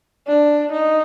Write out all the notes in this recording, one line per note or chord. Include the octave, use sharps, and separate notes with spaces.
D4
D#4